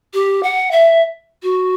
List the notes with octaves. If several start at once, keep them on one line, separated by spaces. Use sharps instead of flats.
G4
F#5
E5
F#4